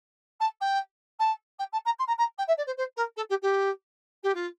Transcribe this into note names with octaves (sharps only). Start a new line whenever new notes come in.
A5
G5
A5
G5
A5
A#5
C6
A#5
A#5
G5
E5
D5
C5
C5
A#4
A4
G4
G4
G4
F4